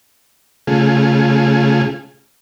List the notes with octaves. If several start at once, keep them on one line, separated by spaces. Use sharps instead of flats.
C#3 A3 F4 G#4